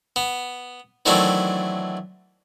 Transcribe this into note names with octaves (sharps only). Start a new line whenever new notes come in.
B3
D#3 E3 F#3 A3 C4 D4